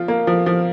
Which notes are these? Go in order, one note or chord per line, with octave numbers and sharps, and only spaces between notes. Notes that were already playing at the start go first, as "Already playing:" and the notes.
Already playing: F3 F4
A#3
F3
F3